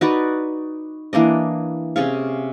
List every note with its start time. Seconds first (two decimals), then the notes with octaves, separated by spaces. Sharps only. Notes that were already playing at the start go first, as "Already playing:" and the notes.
0.01 D#4 F#4 B4 D5
1.13 E3 A#3 D4 D#5
1.96 C3 C#4 G#4 F5